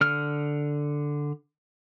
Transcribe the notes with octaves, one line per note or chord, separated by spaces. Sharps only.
D3 F6